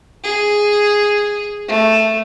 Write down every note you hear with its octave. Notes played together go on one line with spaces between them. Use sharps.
G#4
A3